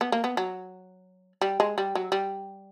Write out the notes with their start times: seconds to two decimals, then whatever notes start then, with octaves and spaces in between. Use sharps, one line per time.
0.01 B3
0.12 A#3
0.24 B3
0.37 F#3
1.41 G3
1.60 G#3
1.78 G3
1.95 F#3
2.12 G3